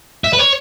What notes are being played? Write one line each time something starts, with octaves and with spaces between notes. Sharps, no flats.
E5
B4
C#5